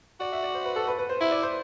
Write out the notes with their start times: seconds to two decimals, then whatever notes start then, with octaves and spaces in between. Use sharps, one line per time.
0.20 F#4 D5
0.32 E5
0.43 D5
0.55 C5
0.65 B4
0.76 A4
0.88 B4
0.99 B4
1.09 C5
1.21 E4 E5
1.32 D5
1.43 C5